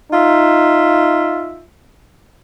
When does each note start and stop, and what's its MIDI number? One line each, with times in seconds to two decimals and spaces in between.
0.11 1.64 63
0.11 1.64 65
0.11 1.64 76